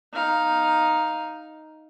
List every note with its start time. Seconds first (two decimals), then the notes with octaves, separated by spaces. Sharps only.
0.13 D#4 F5